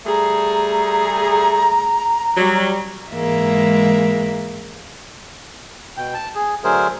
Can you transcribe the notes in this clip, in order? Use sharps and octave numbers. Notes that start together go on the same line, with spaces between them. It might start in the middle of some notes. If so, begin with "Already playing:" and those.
G3 A3 G#4 A#5
F#3 G3
G#2 E3 G#3 A#3 E5
B2 G5
A5
G#4
D3 F#3 A3 G#4 A#4 C5